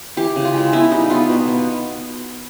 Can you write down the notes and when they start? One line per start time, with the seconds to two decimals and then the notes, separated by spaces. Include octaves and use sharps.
0.17 E3 G4
0.36 C#3
0.45 F4
0.54 G#3
0.73 B3 E4
0.91 G3 D#4
1.10 B3 F4
1.29 B2
1.48 B3